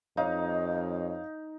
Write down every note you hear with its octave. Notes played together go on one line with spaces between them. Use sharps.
F2 D#4 C#5 D#5 F5